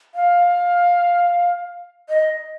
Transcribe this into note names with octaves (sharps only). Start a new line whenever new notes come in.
F5
D#5